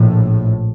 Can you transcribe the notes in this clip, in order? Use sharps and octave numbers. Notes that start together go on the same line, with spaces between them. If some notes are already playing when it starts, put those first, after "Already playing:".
Already playing: A#1 A2